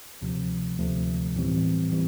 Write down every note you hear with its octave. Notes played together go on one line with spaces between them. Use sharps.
D2 C3 F3 A3
D2 C3 F3 A3
A2 E3 G3 C4
A2 E3 G3 C4